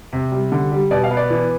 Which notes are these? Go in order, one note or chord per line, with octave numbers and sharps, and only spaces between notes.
C3
G3
D3
G3
B2 D5
F5
B3
D5
E3